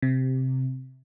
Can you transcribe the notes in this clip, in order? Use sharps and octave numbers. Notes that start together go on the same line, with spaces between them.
C3